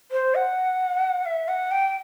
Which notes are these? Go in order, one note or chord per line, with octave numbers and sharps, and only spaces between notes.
C5
F#5
E5
F#5
G5